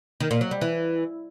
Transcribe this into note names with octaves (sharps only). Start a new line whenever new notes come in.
D#3
A#2
F#3
G3
E3